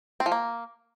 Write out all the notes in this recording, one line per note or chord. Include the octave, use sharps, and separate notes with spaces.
C4
F3
A#3